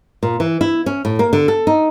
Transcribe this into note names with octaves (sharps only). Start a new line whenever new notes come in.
A#2
E3
E4
C#4
A2
A#3
D3
A4
D#4